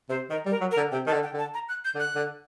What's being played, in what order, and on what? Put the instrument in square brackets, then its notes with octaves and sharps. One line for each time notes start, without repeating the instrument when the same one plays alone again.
[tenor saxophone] C3 [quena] C5
[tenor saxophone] D#3 [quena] A#4
[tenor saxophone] G3
[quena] A#4
[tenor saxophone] F#3
[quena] A#4
[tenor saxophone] D3
[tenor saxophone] C3 [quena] G5
[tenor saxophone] D#3 [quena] A5
[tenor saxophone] D3
[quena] G5
[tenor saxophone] D3
[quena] A5
A#5
F#6
G6
[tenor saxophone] D3
[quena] F#6
[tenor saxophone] D3